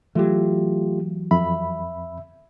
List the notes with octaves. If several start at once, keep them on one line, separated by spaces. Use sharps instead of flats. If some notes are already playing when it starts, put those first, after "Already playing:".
E3 F#3 A3 F4 G4
F2 E5 B5